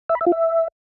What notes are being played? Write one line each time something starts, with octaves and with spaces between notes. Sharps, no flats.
E5
B5
E5
F4
E5